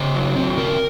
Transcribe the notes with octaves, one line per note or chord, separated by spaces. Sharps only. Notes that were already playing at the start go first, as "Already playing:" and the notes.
Already playing: C#3 C5
F#3
C4
C#3 A#4